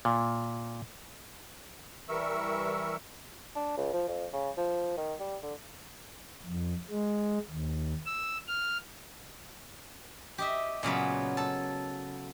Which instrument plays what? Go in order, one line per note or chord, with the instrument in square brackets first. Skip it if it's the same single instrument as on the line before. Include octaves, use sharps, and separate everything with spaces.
[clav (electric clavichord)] A#2
[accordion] E3 G3 A#4 E5 C#6 E6
[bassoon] D4
C#2
F3
F2
C#3
F3
D#3
G3
D3
[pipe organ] F2
G#3
D#2
E6
F6
[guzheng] G4 D#5 E5
A#2 C#3 F#3 B3
A4